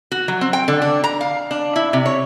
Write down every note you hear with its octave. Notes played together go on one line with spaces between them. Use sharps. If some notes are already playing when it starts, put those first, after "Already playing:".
F#4
F#3
C4
G5
D3
D4
A#5
F5
D4
E4
C3
C#5